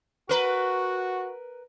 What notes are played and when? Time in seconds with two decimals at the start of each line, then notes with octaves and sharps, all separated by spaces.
0.29 F#4 A#4 B4